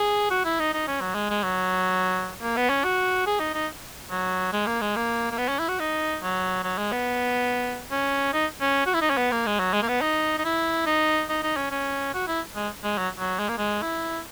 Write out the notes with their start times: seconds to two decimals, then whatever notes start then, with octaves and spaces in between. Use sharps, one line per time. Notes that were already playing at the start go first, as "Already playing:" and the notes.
Already playing: G#4
0.30 F#4
0.45 E4
0.59 D#4
0.73 D#4
0.87 C#4
1.01 F#3
1.15 G#3
1.30 G#3
1.44 F#3
2.42 A#3
2.57 B3
2.69 C#4
2.84 F#4
3.26 G#4
3.40 D#4
3.54 D#4
4.11 F#3
4.52 G#3
4.67 A#3
4.81 G#3
4.96 A#3
5.31 A#3
5.38 B3
5.48 C#4
5.59 E4
5.69 F#4
5.80 D#4
6.22 F#3
6.64 F#3
6.78 G#3
6.92 B3
7.91 C#4
8.33 D#4
8.61 C#4
8.86 F#4
8.94 E4
9.01 D#4
9.10 C#4
9.17 B3
9.31 A#3
9.46 G#3
9.59 F#3
9.73 G#3
9.82 A#3
9.89 B3
10.02 D#4
10.38 D#4
10.45 E4
10.86 D#4
11.29 D#4
11.43 D#4
11.57 C#4
11.71 C#4
12.14 F#4
12.28 E4
12.56 G#3
12.84 G#3
12.98 F#3
13.19 F#3
13.39 G#3
13.49 A#3
13.58 G#3
13.82 E4